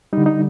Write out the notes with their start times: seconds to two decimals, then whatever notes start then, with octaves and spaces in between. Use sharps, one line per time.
0.13 G3 D#4
0.17 D3
0.26 D#4